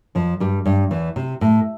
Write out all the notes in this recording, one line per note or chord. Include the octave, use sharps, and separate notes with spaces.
F2 F3
G2 G3
G2 G3
E2 E3
C3
A2